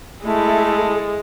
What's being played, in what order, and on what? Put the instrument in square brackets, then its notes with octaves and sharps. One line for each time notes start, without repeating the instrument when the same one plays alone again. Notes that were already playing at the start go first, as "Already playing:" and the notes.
[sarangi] G#3 [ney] A3 [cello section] E4 A4